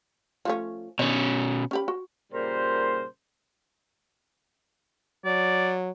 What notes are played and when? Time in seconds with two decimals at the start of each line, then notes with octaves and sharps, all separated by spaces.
0.45 F3 A3 C#4
0.99 B2 D#3 C#4 D4 C#5
1.71 C#4 G4 B5
1.88 F#4
2.33 A#2 C#3 G3 A#4 C5
5.25 F#3 D5